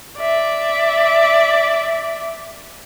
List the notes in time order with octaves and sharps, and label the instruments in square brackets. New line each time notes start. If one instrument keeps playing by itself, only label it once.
[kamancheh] D5 E5